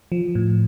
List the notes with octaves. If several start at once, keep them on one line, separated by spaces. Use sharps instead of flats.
F3
A2